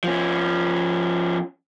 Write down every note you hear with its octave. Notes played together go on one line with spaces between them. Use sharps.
F3 C#4